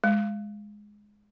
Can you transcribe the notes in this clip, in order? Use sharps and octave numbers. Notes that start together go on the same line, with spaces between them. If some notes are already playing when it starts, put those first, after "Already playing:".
G#3